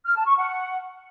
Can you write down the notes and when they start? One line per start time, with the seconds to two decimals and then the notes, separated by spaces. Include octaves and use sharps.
0.05 F6
0.15 A5
0.26 C#6
0.37 F#5